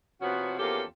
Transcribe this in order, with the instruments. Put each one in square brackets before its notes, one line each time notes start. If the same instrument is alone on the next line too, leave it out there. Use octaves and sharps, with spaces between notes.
[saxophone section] C3 F3 B3 C#4 F#4
E2 F3 A#3 C#4 G4 A4